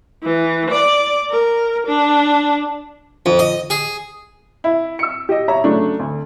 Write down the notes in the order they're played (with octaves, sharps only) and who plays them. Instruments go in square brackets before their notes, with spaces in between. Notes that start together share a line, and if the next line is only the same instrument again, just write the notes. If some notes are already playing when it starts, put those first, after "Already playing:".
[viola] E3
D5
A#4
D4
[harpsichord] F2
D#5
G#4
[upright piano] E4
E6 C#7
G4 D#5
C#5 E5 A#5
C#3 F#3 A3 D4
D2